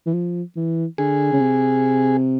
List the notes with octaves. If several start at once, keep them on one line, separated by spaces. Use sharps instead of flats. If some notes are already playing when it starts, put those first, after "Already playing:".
E3
F3
E3
D3 G#4
C#3
C3